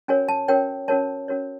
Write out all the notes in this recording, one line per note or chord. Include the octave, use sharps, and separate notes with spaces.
C#4 F#4 A#4 C#5 G#5
A5
C#4 F#4 A#4 C#5 G5
C#4 F#4 A#4 C#5 A5
C#4 F#4 A#4 C#5